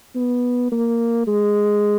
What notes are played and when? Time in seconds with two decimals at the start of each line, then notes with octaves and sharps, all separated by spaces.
0.15 B3
0.72 A#3
1.27 G#3